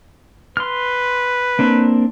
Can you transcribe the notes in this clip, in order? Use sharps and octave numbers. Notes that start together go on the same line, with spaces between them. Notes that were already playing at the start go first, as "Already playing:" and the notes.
B4 C6 F6
A#3 C4 D4